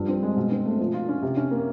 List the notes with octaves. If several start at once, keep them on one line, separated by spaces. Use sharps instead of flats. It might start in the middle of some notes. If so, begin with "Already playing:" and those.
Already playing: G2 F3
C4
G#3
B2
C4
A3
F3
F4
C#4
C3
C#4
A#3